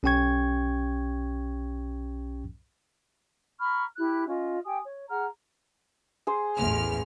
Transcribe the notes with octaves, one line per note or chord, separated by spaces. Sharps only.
B1 C#4 G4 G5 C#6 G#6
A#5 B5 C#6 F6
E4 G4 F#6
C#4 F4 D#5
G4 G5 G#5 D#6
C#5
G#4 F#5 A#5 F6
G#4 C5
A1 E2 F6